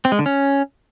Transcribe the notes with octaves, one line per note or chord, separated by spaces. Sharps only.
C4
G#3
D3
C#4